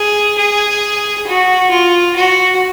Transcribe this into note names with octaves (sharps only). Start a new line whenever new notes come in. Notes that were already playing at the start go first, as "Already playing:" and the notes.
Already playing: G#4
G#4
F#4
F4
F#4